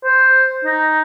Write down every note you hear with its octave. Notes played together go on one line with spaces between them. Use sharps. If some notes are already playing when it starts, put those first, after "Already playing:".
C5
D#4